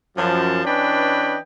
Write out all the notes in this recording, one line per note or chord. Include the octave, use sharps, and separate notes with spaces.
F#2 F3 A5
E3 C#4 D4 B4 D#5 G5